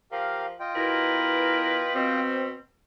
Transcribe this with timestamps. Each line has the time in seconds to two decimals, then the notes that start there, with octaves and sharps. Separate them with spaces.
0.12 F3 G4 A#4 F5
0.60 F4 D#5 G5
0.75 B2 E4 A#4 B4
1.95 B2 C4